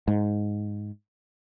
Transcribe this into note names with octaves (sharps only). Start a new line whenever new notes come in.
G#2